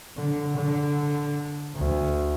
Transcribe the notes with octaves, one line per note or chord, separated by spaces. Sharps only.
D3
D3
D2